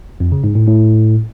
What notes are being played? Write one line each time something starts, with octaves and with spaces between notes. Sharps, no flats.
F2
C#3
G#2
A2
A2